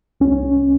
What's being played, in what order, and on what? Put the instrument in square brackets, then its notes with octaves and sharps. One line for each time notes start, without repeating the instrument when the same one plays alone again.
[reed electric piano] C2 C#4